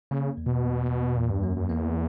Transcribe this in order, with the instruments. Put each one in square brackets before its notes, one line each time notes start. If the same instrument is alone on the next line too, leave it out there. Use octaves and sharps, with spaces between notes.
[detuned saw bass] C#3 [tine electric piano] A#3
[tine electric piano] E2
[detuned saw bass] B2
[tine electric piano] E2
E2
[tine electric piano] E2 [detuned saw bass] A#2
[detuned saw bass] G2
[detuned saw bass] F#2 [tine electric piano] A#3
[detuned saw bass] F#2
[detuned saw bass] E2 [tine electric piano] A#3